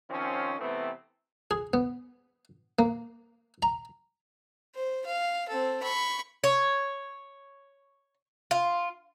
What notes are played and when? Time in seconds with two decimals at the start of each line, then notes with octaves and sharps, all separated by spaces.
0.10 D#3 F3 C4 C#4
0.59 C3 E3 A3 B3 C4
1.51 G#4
1.73 B3
2.79 A#3
3.63 A#5
4.75 C5
5.06 F5
5.48 C4 A4
5.83 B5 C#6
6.44 C#5
8.51 F4